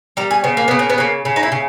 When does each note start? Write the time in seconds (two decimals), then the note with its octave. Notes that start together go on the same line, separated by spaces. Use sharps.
0.17 G3 A#4
0.31 G#4
0.44 C#3 B3
0.57 A#3
0.68 C#3 B3
0.79 A#3
0.90 B3
0.98 C#3 A#3
1.25 C#3
1.36 D#4
1.43 E4
1.52 C#3